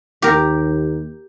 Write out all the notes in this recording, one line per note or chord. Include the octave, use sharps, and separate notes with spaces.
D#2 G4 A#4